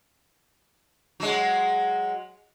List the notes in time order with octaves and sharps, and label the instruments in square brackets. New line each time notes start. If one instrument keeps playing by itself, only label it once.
[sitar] F#3 G#3